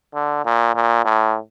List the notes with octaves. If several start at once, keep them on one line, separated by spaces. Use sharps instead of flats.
D3
A#2
A#2
A2